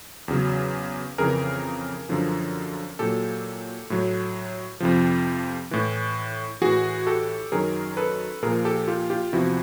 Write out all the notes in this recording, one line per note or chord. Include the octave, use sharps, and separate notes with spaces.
E2 C#3 F#3
F2 C#3 E3 G#4 A#4
F#2 D3 F3
A#2 F#3 G4 A4
A2 F#3
F2 C3 F3
A2 E3
A2 E3 F#4 G#4
G4 A4
F#2 D#3 F#3 G#4 A#4
A4 B4
A#2 F3 G#4 A#4
G4 A4
F4 G4
F4 G4
E2 C3 F3 E4 F#4